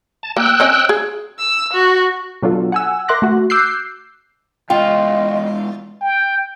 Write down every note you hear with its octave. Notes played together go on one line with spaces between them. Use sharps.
A5
A#3 G5 E6 F#6
C4 C#4 D#5
G#4
E6
F#4
B2 F#3 D4 F4 A4
F#5 G#5 E6
A#4 E5 C6 D6 F#6 A#6
A3 F#4
D6 E6 F#6 G6 C7
E2 G#3 F4 D#5 F5 G5
G5